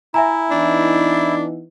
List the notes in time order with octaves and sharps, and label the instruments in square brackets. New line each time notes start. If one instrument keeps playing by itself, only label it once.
[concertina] E4 [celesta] E5 G#5 A#5
[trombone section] E3 B3 D#4 [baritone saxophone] D4